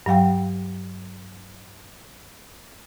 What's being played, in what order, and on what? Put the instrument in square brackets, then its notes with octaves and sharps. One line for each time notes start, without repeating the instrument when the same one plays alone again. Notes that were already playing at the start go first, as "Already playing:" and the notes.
[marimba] G2 F#3 F5 G5